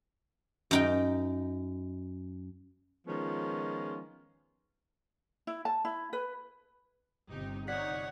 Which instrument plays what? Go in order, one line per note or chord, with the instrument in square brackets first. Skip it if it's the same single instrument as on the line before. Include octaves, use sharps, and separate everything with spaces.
[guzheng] F#2 D#4 G5
[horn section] D#3 F3 G#3 B3 C#4 F4
[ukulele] E4
A5
E4
B4
[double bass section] G1 C3 [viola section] D#4 G4
[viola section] D#4 C#5 [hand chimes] D5 B6 [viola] F#5